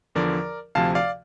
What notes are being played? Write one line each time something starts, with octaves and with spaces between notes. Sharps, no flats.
E2 D3 F3 A#4 D5
D2 C3 F3 F5 A5
D5 F5